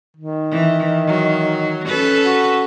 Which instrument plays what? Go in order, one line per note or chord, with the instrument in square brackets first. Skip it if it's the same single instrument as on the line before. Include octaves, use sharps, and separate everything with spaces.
[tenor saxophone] D#3
[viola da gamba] E3
F#3
C#4 A4 B4
[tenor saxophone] F#4